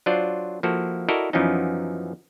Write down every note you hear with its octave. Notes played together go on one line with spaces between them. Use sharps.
F#3 D4 F4 C5 D5
F3 A#3 E4 F#4 A4
E4 F#4 A4 A#4 D5 D#5
F#2 E3 F3 B3 C#4 D#4